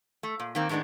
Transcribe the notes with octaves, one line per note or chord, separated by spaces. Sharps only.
A3
A#2
D#3 A#3 C4
A2 D#3 G#3 B3 D4